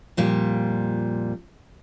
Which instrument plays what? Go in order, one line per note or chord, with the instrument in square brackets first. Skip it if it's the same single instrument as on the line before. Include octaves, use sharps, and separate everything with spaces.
[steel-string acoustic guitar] F2 A#2 G3